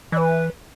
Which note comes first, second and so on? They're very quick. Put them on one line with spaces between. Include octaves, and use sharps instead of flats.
E3 D#5 B4